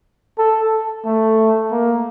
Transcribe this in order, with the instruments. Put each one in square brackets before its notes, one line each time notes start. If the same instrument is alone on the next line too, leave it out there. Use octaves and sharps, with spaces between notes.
[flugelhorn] A4
A3
A#3